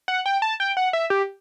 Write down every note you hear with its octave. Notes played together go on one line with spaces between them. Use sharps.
F#5
G5
A5
G5
F#5
E5
G4